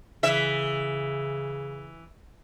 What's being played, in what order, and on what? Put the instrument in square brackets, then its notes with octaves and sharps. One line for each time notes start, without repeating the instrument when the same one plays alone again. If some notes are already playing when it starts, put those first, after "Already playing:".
[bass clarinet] C#3 [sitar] E3 E5